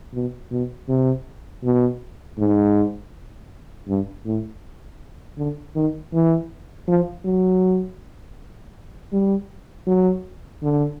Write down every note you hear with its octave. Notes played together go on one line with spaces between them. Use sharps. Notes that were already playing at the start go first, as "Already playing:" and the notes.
B2
B2
C3
B2
G#2
G2
A2
D3
D#3
E3
F3
F#3
G3
F#3
D3